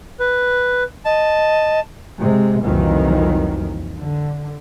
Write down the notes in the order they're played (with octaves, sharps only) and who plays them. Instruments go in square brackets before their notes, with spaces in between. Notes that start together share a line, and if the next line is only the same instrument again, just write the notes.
[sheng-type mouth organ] B4
[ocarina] D#5 [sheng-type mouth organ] A5
[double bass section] C3 G#3
C2 F2 A#2 D#3 E3 F#3
D3